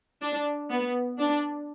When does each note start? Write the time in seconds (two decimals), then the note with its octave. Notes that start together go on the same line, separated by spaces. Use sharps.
0.22 D4
0.70 B3
1.18 D4